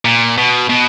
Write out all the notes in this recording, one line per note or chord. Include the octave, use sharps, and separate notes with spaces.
A#2
B2
B2